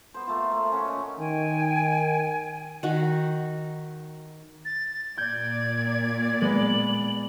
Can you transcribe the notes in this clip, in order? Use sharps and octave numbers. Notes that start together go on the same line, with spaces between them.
B3 C5
A3 A#3 F4
A3
C#4 F#5 A5
A#2 D#5
D#3 G5 G#5
D#3 F#4
A6
A#2 D5 G6 G#6
G#3 B3 F#7